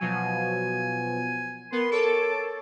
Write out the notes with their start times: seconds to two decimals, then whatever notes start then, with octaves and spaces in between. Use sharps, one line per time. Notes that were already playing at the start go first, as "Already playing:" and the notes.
0.01 B2 F3 F#3 G#5
1.72 B3 A#4 C6
1.91 A4 C#5 A5 D6